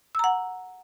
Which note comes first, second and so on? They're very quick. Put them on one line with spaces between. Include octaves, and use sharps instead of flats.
E6 A#5 F#5